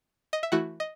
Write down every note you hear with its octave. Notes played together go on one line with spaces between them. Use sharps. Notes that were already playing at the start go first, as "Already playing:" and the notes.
D#5
E5
E3 A3 E4 F#4 F#5
D#5